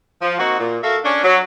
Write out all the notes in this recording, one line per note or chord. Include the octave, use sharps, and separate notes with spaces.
F3
A#3 C4 D#4 F#4
A#2
F#4 A4 A#4 E5 F5
C#4 D4
F#3